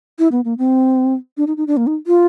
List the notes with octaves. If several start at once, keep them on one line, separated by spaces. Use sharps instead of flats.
E4
B3
A#3
C4
D4
D#4
D#4
D4
A#3
D#4
F4